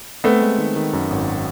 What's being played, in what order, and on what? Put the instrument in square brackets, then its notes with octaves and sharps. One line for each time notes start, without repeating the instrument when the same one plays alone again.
[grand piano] A3 B3 [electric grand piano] C4
[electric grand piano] G#3
D#3
D#3
F#2
G#1